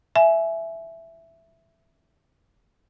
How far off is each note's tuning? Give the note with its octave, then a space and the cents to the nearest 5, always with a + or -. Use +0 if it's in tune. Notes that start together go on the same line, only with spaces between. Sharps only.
E5 +5 G#5 +20